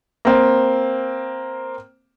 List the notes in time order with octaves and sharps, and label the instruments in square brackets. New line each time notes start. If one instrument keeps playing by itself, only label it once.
[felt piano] A#3 C4